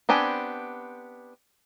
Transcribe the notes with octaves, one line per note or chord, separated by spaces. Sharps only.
B3 C4 D4 G4 G#5